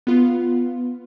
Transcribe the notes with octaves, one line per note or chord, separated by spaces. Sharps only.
B3 F4